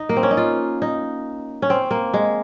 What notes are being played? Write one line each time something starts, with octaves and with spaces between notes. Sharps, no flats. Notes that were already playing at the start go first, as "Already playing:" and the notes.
Already playing: D#4
A#3
C4
C#4
D#4
F4
D#4
C#4
C4
A#3
G#3